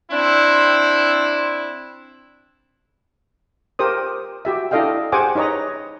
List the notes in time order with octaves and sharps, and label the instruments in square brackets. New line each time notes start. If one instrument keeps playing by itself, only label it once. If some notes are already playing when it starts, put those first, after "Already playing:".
[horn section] C4 D4 E4
[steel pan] G4 A#4 C5 D#6
F#4 G4 E5
D4 E4 A4 D#5 F5 G5
G4 G#4 C5 F#5 G#5 D6
D#4 B4 C#5 D#5 A#5